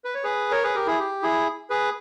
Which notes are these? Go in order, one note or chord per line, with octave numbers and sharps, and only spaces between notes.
B4
C#5
G#4 B4
A#4 C#5
G#4 B4
G4 A#4
E4 G#4
G4
E4 G#4
G#4 B4